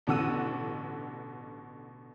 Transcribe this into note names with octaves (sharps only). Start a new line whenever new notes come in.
A1 B2 D3 F#5 E6 D#7